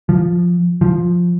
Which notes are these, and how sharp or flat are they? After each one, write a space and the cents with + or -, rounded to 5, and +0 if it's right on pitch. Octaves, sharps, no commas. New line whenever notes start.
F3 +0
F3 +5